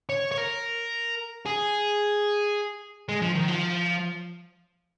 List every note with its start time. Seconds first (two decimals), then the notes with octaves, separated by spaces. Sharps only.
0.09 C#5
0.31 C#5
0.37 A#4
1.46 G#4
3.09 G#3
3.22 F3
3.35 D#3
3.48 F3